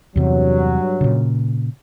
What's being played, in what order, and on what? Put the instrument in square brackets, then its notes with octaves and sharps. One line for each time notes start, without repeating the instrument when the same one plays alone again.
[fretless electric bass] E2 C3 [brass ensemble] G2 F#3
[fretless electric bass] A#2 C#3